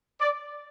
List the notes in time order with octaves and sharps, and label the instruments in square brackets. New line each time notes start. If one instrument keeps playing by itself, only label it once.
[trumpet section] D5